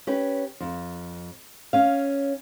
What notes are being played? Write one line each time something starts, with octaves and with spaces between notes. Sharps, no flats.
C#4 G4 B4
F2
C#4 F5